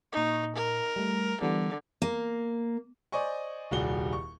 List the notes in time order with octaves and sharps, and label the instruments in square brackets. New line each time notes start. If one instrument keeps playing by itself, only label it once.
[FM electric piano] A#2 C#6 [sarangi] D#4
[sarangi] A#4
[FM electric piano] G3 A3
[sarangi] D3 [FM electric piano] E3 G3 B3
[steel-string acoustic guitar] A#3
[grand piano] C5 D5 D#5 G#5 C#6
D#1 C2 G3 F#4 G#4 G7
C#6